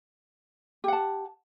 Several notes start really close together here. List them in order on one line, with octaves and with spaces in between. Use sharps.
G4 F#5 A5